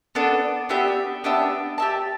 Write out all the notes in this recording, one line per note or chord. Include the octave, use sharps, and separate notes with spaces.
B3 D4 A4
B3 D4 G4 E5
B3 D4 G4 E5
G4 E5 A5